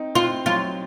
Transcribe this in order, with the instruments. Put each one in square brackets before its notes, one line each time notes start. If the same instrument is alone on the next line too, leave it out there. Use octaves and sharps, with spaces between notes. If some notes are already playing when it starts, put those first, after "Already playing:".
Already playing: [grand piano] C4 D#4
[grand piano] C4 [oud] F4
[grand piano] F#3 [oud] F4